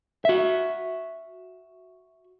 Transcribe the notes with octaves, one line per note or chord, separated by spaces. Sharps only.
F#4 E5